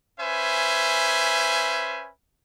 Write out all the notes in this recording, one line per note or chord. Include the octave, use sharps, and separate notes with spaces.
C#4 B4 C5 E5 G#5